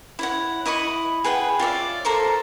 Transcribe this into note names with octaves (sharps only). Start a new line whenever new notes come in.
E4 C#5 F#5
E4 D#5 B5 C#6
G#4 B4 F#5 G5
F4 C#5 D5 E5
A4 A#4 C5 C#6